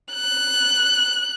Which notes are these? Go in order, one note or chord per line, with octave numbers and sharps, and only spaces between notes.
F#6